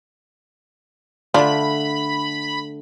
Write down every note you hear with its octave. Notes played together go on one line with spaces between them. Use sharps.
D3 A3 D4 F4 B5